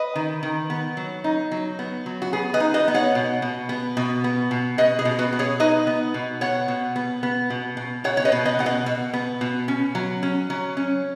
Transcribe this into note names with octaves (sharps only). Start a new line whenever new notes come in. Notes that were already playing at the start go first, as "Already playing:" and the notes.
Already playing: B4 D#5
D#3
D#3
B3
F#3
D#4
F#3
B3
F#3
F#4
B3 G#4
B4 D#5
D#4
B4 D#5
B3
C#5 F#5
B2
B2
B3
B2
B3
B2
B2 B4 D#5
G#4
B2
F#4 B4
B3
G#4 C#5
D#4 B4 D#5
B3
B2
B3 C#5 F#5
B2
B3
B3
B2
B2
B2 C#5 F#5
C#5
B4 D#5
B2
B4 D#5
B2 F#5
B4 D#5
B2
B3
B2
C#4
F#3
C#4
F#3
C#4